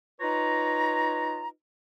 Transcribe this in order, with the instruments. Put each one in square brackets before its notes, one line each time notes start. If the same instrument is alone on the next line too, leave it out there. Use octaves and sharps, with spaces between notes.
[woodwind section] D#4 F4 B4 C#5 A#5